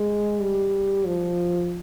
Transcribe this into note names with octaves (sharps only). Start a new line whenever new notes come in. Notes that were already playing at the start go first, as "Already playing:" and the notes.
Already playing: G#3
G3
F3